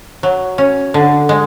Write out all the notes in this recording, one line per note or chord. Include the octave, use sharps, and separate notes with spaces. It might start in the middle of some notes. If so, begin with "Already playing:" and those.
F#3
C#4
D3
G#3